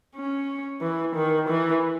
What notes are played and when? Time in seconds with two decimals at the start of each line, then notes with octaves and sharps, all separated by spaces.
0.16 C#4
0.82 E3
1.15 D#3
1.49 E3